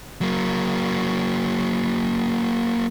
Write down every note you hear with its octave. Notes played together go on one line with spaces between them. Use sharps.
F#3 A#3